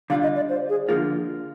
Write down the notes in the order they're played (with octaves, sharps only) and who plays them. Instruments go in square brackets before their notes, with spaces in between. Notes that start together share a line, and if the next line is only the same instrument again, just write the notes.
[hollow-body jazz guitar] D3 G3 D4 F4 [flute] F5
[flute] D#5
D5
C5
G#4
[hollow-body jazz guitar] D3 F3 A#3 F4 [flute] G#4